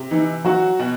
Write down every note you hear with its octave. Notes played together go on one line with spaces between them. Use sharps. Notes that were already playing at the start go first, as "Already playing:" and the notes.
Already playing: C3
E3 D#4
F#3 F#4
B2